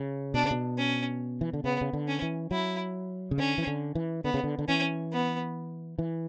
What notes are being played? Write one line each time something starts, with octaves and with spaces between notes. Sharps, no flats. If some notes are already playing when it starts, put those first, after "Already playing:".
Already playing: C#3
B2 D4
C#3
B2
C#4
E3
D3
C#3 B3
C#3
D3
C#4
E3
F#3 E4
C#3
D3 C#4
E3
D3
E3
D3 B3
C#3
D3
D3
E3 C#4
B3
E3